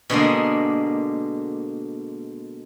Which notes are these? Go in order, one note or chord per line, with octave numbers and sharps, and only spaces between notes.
B2 D3 G#3 A#3